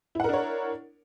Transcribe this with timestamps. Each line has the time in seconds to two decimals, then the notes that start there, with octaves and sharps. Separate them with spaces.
0.15 E4
0.20 F#5
0.24 A#4
0.29 D4
0.33 C#5